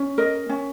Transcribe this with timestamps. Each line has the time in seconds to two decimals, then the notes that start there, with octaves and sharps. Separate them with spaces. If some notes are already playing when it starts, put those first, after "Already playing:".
Already playing: C#4
0.18 A#4 D#5
0.49 C#4